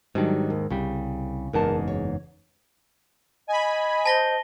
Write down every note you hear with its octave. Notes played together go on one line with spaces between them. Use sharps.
G#2 D#3 F#3 G3 D4
D#2
C2 C#3 G3
F#1 E2 G#2 A#4 A5
C#5
D#5 G#5 B5
C5 A5 A#6 G7